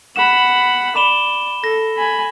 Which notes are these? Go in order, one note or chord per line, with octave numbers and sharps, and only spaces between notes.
F#5 B5 E7
D5 B5 E7 G7
A4 A#6
G#5 B5